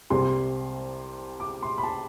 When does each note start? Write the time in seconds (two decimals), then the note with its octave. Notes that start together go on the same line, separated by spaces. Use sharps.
0.10 C2 C3 G3 C6
1.40 D6
1.63 C6
1.78 B5
1.83 A5